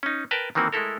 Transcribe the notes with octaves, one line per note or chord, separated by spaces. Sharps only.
C#4 D#4
A#4 B4 G5 A5
D#3 E3 A#3 C4 F#4
G#3 A3 E4 A4 A#4